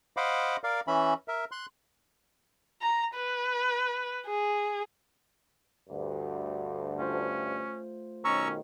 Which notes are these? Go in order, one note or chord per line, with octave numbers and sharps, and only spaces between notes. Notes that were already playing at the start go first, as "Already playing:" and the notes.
C5 D#5 F5 F#5 B5 D6
A#4 D5 F5
E3 C#4 E5 B5
A#4 E5
C6 F#6
A#5
B4
G#4
D2 G2
A3 C#4 F4 C5
B1 D#3 C#4 A#5 C#6 E6